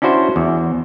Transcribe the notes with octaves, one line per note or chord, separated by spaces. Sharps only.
C#4 D4 E4 F#4 C5
E2